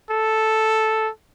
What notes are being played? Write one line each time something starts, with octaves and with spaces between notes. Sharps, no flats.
A4